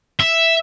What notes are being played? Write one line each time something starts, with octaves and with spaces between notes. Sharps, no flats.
E5